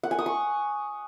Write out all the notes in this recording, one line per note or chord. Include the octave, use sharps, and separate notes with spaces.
F#5
G#5
D#6
C#6